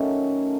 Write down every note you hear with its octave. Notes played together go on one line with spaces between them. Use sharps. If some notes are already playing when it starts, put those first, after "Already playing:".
Already playing: D#3 F#3 A3 C#4